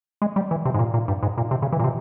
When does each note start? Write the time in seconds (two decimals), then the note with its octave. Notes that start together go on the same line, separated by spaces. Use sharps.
0.22 G#3
0.36 G3
0.51 E3
0.65 C3
0.74 G#2
0.79 A#2
0.94 A#2
1.08 G2
1.23 G#2
1.38 A#2
1.51 C3
1.62 C#3
1.72 E3
1.79 A#2
1.84 C3